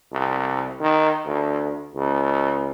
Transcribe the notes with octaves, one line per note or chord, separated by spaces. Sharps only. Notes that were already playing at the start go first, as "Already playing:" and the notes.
C2
D#3
D2
C#2